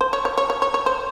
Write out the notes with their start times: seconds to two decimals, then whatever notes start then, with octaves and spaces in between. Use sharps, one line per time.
0.01 C5
0.13 C#5
0.25 C#5
0.38 C#5
0.50 C#5
0.62 C#5
0.74 C#5
0.86 C5